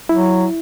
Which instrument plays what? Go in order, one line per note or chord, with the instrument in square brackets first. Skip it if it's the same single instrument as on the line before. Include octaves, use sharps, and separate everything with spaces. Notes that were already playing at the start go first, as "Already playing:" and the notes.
[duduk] F#3 [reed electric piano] E4